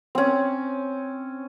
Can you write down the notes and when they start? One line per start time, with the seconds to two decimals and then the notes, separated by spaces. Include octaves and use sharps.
0.15 C4 C#4